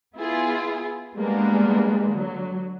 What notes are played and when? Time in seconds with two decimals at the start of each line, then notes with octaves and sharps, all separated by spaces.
0.16 B3 E4 F4 G#4
1.15 G3 G#3 A#3 B3 D4
2.11 D3 F#3